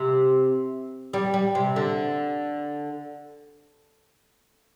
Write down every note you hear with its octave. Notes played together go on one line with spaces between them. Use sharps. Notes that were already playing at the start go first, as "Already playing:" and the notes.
Already playing: C3
G3
G3
C3
D3